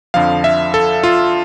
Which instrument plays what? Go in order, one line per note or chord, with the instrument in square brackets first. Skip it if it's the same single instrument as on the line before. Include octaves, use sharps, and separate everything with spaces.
[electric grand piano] F2 D3 F3 F5
E5
A4
F4